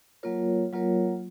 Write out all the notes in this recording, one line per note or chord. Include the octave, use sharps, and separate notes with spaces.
F#3 A#3 F4 A#4 C#5
F#3 A#3 F4 A#4 C#5